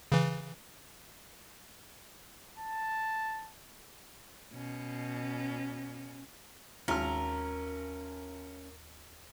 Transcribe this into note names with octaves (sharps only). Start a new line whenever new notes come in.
C#3 E3
A5
B2 C#4
G#1 D#2 C#4 A#4 F6